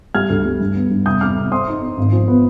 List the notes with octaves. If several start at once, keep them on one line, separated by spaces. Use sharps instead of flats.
G3 F6 G#6
D2
G3
G2
B3
G2
F1 D#6 G6
F2 D6 F6
F1
C4 C6 D#6
D#4
C4
G#1
F3
B3